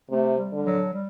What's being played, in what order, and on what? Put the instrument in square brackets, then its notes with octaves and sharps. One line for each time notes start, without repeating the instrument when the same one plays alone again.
[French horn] C3 [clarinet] A3
[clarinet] G3
[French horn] D3
[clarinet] F#3
G3